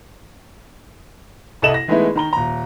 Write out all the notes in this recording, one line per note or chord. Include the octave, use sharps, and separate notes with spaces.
C2 E4 A4 D#5 E7 F#7
A#6
E3 G#3 A3 B3 D#4 E4
D#3 A#5 G7
D#1 A#5